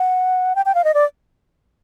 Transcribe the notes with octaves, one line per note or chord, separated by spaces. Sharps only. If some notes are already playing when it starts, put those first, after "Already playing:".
Already playing: F#5
G5
G5
F5
D#5
D5